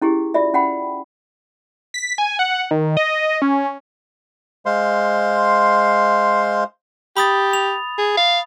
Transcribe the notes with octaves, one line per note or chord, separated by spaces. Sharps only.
C#4 E4 G4 G#4
F4 D5 E5
C#4 F#5 G5 B5
B6
G#5
F#5
D#3
D#5
C#4
G#3 C5 F5 C6
G4 B5 D#6 A6
F7
G#4
F5